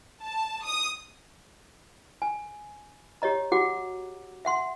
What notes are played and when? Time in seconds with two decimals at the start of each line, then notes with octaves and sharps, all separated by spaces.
0.22 A5
0.64 D#6
2.22 G#5
3.22 G4 C#5 D#5 A#5
3.52 F#4 G4 F#5 D6
4.45 E5 F#5 C6